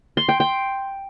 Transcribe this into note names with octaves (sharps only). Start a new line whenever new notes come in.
C6
G5
G5